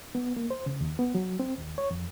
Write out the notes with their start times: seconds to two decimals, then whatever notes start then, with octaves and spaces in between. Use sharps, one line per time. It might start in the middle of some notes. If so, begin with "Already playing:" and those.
0.15 B3
0.37 A#3
0.50 C5
0.66 C#3
0.81 D#2
0.99 B3
1.15 F#3
1.40 C4
1.59 D#2
1.78 C#5
1.91 F2